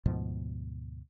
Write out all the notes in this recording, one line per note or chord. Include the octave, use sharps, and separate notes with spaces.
D2 G#2 B2 F3